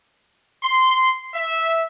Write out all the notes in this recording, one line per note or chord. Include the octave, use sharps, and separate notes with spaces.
C6
E5